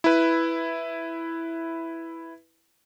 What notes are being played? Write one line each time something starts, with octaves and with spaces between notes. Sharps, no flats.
E4 B4